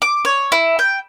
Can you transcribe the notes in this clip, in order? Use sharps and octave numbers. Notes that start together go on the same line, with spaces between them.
D6
C#5
E4
G5